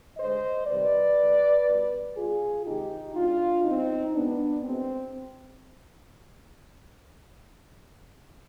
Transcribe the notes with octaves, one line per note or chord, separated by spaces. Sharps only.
D3 G#3 C5 D#5
C3 D#3 G3 B4 D5
D3 G#3
B2 G3
B2 G3 F4 G#4
C3 D#3 G#3 D#4 G4
B2 G#3 D4 F4
B2 G3 C4 D#4
B2 G#3 B3 D4
B2 G#3 C4